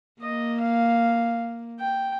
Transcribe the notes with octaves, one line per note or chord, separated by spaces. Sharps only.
A#3 D#5
F5
G5